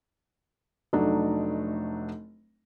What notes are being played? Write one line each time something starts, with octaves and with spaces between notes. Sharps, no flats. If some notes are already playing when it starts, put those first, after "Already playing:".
F1 F#3 A3 D4 D#4